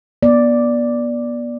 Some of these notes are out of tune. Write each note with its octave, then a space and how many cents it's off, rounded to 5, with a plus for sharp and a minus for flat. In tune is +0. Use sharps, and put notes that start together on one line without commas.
B3 -35 D5 +0